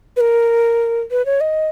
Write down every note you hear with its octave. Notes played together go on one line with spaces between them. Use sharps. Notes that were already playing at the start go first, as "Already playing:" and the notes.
B4
A#4
B4
C#5
D#5